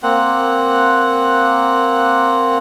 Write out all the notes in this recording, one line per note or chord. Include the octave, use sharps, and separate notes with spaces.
A#3 C4 F#5